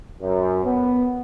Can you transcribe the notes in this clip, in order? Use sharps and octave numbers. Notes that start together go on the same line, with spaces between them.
F#2
B3